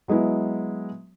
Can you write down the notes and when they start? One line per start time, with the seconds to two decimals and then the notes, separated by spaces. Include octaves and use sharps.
0.08 F#3 G#3 B3 E4